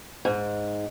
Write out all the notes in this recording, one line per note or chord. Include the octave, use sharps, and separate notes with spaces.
G#2